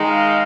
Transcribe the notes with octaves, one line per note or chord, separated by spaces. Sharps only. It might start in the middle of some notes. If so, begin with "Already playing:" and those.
Already playing: D#3 G#3 D#4
F5